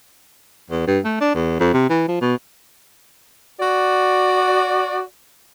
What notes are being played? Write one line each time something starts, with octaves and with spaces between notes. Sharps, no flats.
E2
G2
A3
D4
E2
F2
C3
E3
F3
B2
F#4 D5